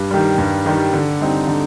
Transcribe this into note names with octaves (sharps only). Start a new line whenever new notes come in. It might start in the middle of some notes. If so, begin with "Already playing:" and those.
Already playing: G2
D#3 G3
G2
D#3 G3
D3
G3 C4 D#4
D3